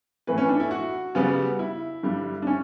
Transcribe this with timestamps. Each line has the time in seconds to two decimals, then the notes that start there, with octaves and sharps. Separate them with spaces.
0.27 A2 E3 A3 B4
0.38 C#4
0.49 D4
0.60 E4
0.71 F#4
1.15 C#3 G3 B3
1.59 E4
2.03 G2 D3 G3
2.42 D4
2.47 C#4